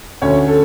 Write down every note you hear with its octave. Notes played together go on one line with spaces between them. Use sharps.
D2 C#4 C#5
A4